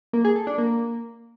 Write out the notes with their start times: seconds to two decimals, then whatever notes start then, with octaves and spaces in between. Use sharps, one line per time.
0.13 A#3
0.25 G#4
0.36 A4
0.47 D4
0.58 A#3